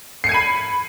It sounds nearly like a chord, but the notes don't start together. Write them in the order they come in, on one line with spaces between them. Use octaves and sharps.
C7 C#7 G#6 D#7 B5